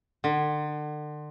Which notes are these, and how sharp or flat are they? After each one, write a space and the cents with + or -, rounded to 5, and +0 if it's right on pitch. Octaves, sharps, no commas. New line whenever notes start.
D3 +35